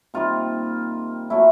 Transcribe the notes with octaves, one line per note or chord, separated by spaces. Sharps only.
C3 D#3 G3 A#3 F4
A#2 F#3 A3 E4